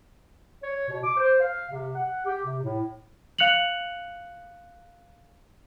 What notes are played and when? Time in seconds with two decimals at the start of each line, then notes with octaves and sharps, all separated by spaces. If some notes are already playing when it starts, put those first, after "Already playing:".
0.62 C#5
0.88 B2
1.03 D6
1.16 C5
1.40 F5
1.70 C3
1.94 F#5
2.25 G4
2.44 C3
2.62 A2
3.39 F5 F#6 C#7 F7 F#7